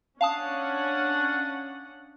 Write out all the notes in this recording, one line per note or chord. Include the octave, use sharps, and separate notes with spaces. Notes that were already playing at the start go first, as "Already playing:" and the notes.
C#4 D4 F5 F#5 A5 D#6